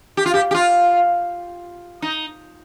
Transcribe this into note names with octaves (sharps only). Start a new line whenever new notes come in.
G4
F4
G4
G4
F4
D#4